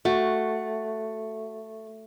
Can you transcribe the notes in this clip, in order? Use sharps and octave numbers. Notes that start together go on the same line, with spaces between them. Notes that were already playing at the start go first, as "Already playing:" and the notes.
A3 F#4